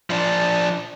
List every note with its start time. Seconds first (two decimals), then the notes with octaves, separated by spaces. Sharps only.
0.10 F3 D4